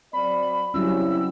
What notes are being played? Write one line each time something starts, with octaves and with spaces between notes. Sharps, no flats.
F#3 C4 D5 B5
C#3 F#3 G3 C4 C#4 E4 E6